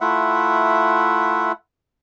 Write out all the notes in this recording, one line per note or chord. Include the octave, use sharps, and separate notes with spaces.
A3 E4 F4 E5 F#5